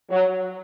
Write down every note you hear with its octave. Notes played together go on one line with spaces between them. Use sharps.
F#3